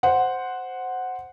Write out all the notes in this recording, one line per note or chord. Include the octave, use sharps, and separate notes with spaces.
C5 F#5